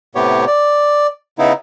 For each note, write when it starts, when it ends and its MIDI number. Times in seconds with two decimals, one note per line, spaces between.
0.15 0.45 45
0.15 0.45 48
0.15 0.45 59
0.15 0.45 67
0.15 0.45 73
0.47 1.07 74
1.39 1.53 49
1.39 1.53 59
1.39 1.53 63
1.39 1.53 64